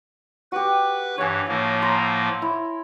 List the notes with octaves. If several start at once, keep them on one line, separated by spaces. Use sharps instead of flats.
F#4 G4 B4
G2 E3 C#5 G#5
A2 F3 A#3
A#5 C6
E4